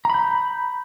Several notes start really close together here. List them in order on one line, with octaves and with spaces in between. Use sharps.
A#5 B5 G6